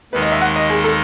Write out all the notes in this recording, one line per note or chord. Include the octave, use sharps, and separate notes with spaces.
D#2 D#3 G#3 D#4 B4
D#5
E5
F#5
D#5
G#4
A4